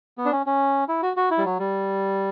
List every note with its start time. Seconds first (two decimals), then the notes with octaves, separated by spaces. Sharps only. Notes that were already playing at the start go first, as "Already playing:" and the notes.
0.18 B3
0.25 D4
0.32 C#4
0.46 C#4
0.89 E4
1.03 F#4
1.17 F#4
1.31 E4
1.38 G3
1.45 F#3
1.59 G3